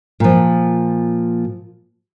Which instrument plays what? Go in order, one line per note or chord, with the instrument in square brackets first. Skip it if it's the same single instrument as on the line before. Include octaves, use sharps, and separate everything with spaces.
[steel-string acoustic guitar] A#2 F3